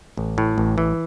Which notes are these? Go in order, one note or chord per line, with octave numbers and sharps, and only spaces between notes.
A1
A2
A1
E3